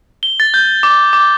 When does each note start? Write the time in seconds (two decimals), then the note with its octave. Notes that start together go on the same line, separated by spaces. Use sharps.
0.23 G7
0.40 A6
0.54 G6
0.83 D6
1.13 D6